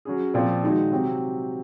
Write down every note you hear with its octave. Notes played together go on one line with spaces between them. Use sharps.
F#3 C#4 G#4
A#2 F3 C4
D#3 G#3 D#4 F#4
C3 F#3 C4